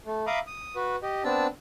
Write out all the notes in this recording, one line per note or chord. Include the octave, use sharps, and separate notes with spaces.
A3
E5 F5 A#5 B5 D6 D#6
D#6
F#4 B4
G4 D#5
B3 C4 D4 A5 E6